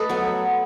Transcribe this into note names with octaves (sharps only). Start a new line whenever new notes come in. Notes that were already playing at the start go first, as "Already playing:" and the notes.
Already playing: A3 A4 B4 D#5
F#3 B3